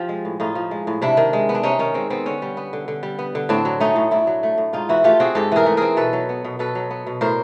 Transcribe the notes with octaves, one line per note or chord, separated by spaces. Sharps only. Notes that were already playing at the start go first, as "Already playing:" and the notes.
Already playing: F3 F4 G4
G#3
A2
A2 D#4 F4
F3
G#3
A2
C3 D4 E4
D#3
G#3
B3
D4
C3 C#4 D#4
D#3 C#4
G#3 C4
B3 C4
D3 C#4
G3
B3
D3
D3
G3
B3
D3
A2 C4 D4
F#3
A3 C#4 D#4
A2
A2 D4 E4
F#3
A3
A2
G#2 D#4 F4
E3 E4 F#4
A3 F4 G4
C4 F#4 G#4
G#2 G4 A4
E3 G#4 A#4
A3
C4 G#4 A#4
B2 A4 B4
F#3
B3
B2
B2 A4 B4
F#3
B3
B2
A2 A#4 C5